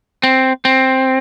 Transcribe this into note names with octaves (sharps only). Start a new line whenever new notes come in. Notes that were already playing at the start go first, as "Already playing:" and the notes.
C4
C4